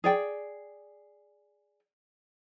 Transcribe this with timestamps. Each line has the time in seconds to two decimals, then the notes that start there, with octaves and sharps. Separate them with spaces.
0.04 G#4 D5 G5